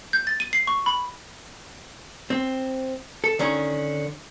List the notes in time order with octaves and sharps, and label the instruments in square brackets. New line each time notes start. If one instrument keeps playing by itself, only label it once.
[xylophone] G6
A6
D#7
C7
C#6
B5
[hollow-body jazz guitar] C4
A4
D3 D#3 C#4